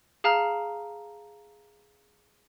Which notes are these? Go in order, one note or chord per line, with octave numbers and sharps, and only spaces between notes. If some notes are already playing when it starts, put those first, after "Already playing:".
G#4 F5 A5 A#5 F6